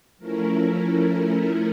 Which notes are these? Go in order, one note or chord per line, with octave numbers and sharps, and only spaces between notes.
F3 A3 C#4 E4 A#4